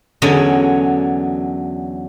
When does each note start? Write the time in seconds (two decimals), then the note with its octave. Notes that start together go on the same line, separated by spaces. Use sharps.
0.22 E2 D3 F#3 C#4 D#5